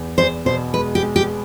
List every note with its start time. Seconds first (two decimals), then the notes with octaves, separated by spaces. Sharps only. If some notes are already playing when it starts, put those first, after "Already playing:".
Already playing: E2
0.18 E2 C5
0.45 B2 C5
0.73 G#3 B4
0.95 G4
1.02 G#3
1.16 G4